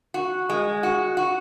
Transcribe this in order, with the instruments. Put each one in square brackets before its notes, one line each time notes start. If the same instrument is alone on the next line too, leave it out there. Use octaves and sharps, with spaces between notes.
[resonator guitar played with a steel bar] F#4
G#3
F#4
F#4